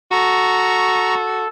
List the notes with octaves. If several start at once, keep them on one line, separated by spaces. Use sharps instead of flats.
F#4 A4 A#5 C#6